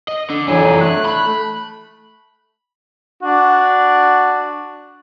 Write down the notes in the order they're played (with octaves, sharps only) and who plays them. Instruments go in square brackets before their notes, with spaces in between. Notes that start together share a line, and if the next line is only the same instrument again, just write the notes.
[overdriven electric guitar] D#5
D3
[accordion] F2 F#3 G#5 [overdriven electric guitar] E3 D4
[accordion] A3 F#6
[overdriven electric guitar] B5
[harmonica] D4 F#4